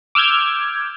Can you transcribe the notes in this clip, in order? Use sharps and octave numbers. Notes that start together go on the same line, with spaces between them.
D6 E6 F6 G6 G#6